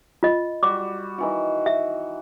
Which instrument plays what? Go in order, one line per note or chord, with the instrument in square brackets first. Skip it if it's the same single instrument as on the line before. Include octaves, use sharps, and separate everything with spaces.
[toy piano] F4 D#5
[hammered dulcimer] G3 F#4 [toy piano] D6
[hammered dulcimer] D#3 E3 F#4
[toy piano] E5